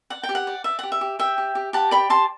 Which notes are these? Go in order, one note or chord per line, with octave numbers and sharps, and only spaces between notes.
D5 F#5
G5
G4
F#5
D5
D5 E5
G4 F#5
E5
G4
G4 E5 G5
G4
G4
G4 F#5 A5
D5 G5 B5
G4 A5 C6